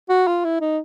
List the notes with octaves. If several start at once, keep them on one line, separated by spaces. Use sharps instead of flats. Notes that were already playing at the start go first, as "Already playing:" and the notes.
F#4
F4
E4
D#4